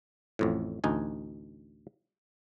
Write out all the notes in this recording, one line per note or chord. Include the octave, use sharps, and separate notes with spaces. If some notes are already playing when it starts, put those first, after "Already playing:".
A1 F2 A2
A1 D2 D#4 G#5